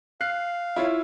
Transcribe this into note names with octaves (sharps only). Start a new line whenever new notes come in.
F5 F#6 C7
E4 F4 C#5